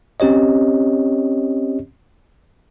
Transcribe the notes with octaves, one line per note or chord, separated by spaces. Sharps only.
C4 C#4 G4 C#5 D#5